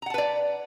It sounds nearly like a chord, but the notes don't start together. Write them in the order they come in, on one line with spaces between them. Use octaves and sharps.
A#5 F#5 A5 B4 D5